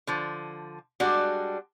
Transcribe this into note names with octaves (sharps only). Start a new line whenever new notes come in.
D3 F3
G3 G#3 D4 F#4